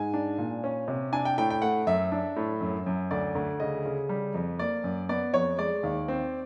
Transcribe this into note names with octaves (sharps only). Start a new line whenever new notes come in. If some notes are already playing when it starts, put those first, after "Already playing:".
Already playing: G#2 G#5
D4
A#2
C#4
C3
D4 G#5
G5
A2 G5
G5
A3 F#5
F#2 E5
D4
A2
F#2
F#2
D2 D5
D2
C#3 D#5
C#3
G3
F2
A#3 D5
F#2
B3 D5
F2 C#5
G#3 D5
D#2
C4